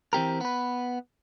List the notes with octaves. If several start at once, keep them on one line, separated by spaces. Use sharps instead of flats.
E3 C4 G4 A#4
B3 B4